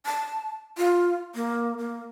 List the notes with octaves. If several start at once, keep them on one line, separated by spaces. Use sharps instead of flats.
A5
F4
A#3
A#3